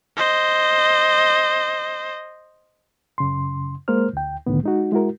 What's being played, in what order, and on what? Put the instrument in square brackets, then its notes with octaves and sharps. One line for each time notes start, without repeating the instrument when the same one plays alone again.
[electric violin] C5 D#5
[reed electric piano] F#2 C#3 C6
G#3 A#3 A#4 C5 F6
D2 G5
C2 A2 D3 D#3 B3
G#3 D#4 F#4
G#3 E4 F#4 A#4